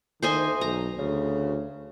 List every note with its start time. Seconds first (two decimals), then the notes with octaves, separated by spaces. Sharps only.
0.23 D2 D#3 C5 D#5 G#5
0.61 B1 A#5
0.99 D2 C#3